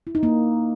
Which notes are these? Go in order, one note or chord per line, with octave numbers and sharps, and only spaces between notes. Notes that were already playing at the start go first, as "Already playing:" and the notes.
E4
D#4
A#3